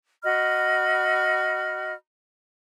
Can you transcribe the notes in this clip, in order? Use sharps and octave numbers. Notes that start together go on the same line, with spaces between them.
F#4 D#5 B5 F6